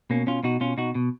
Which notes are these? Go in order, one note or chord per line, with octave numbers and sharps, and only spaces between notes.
B2 A#3 C#4
B2 C#4 F4
B2 D#4 F#4
B2 C#4 F4
B2 D#4 F#4
B2